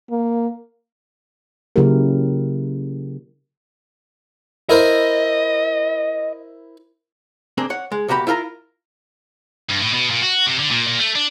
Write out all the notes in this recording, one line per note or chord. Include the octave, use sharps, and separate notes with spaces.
A#3
C#3 F#3 A#3 E4 G4 A#4
E4 A#4 C5 D#5
A#3 C4 D4 G#4
C#5 F#5
G#3
B1 A#3 F#4 G4 B5
E4 F4 A#4 A5 A#5
G2
A2
B2
A#2
F#4
C3
D3
A#2
A#2
A3
D4